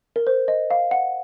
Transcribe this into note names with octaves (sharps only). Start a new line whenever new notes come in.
A#4
C5
D#5
F5
F#5